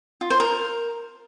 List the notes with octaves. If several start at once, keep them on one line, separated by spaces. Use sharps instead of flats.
F4
C5
A#4